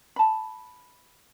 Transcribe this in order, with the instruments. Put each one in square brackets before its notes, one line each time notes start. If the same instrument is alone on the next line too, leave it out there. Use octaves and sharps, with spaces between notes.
[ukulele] A5 B5